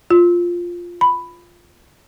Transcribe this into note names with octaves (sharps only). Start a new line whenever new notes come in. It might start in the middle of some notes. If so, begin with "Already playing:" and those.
F4
B5